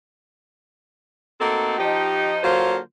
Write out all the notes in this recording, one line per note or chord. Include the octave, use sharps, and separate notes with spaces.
A3 A#3 C4 D#4 F#4 A4
F3 D#4 G4
D3 F#3 A#3 F4 C5